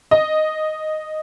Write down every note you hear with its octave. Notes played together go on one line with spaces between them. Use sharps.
D#5